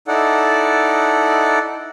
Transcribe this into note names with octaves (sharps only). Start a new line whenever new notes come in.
D#4 E4 A4 D5 F#5